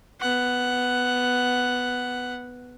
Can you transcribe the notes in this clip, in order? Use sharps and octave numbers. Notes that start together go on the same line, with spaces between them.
B3 F#5